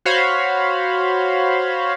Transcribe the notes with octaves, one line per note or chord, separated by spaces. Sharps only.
F#4 C5 C#5 F5 B5 C6